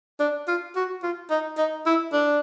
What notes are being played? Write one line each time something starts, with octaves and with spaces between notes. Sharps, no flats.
D4
F4
F#4
F4
D#4
D#4
E4
D4